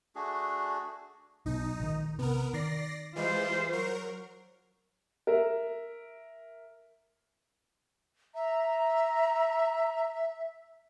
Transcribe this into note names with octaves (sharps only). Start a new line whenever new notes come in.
A3 D4 F#4 G#4
B1 B2 D#4
A#1 D#3
C3 B3 A#4
D#3 D5 A#6 C7
E3 G3 G#3 F4 C5
F#3 A#4
A#4 E5
E5 A#5